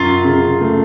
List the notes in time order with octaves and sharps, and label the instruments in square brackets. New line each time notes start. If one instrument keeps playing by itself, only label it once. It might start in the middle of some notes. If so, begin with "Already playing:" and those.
Already playing: [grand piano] F#2 [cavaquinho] F4
[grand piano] C#3
A3